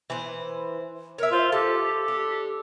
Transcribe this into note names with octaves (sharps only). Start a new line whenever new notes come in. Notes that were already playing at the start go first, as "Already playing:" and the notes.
E3 B4 C5
A#4 C#5 E5
F4 C5
G4 A4 A5
D4